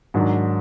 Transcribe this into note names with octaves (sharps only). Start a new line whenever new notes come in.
G#2 D#3 F#3 D4 F#4